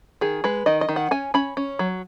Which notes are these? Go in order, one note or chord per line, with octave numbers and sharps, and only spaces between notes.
D#3 G#4
G#3 B4
D#3 D#5
D#5
D#3
F#5
C#4 G#5
C#4 B5
C#4
F#3